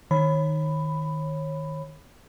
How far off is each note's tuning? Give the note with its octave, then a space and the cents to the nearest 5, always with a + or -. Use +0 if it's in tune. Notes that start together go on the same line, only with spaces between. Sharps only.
D#3 +0 C#5 -25 B5 +10